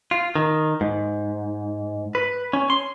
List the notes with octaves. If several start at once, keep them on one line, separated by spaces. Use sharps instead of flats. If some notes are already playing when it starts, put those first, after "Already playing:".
F4
D#3
G#2
B4
C#4
C6